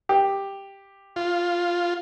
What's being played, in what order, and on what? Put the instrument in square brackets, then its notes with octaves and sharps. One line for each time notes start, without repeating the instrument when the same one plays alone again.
[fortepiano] G4
[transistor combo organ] F4